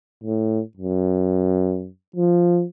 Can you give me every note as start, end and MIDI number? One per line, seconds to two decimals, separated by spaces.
0.24 0.61 45
0.77 1.88 42
2.16 2.64 53